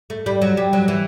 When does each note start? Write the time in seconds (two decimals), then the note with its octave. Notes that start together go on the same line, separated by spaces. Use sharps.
0.10 A3
0.26 G3
0.42 F#3
0.57 G3
0.73 F#3
0.88 E3